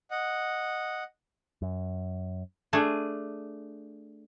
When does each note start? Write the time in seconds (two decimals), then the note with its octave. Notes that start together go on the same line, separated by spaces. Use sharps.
0.11 D#5 F#5
1.62 F#2
2.73 A3 D4 G#4